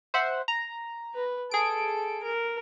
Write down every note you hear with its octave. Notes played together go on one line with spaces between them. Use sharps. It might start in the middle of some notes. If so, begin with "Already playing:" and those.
C5 E5 F#5
A#5
B4
G#4 A4 D7
A#4